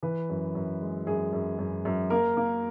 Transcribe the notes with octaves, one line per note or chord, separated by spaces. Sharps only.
E3 B4
F#2
F#2
G#3
F#2 G#4
F#2
F#2
F#2
A#3 A#4
A#3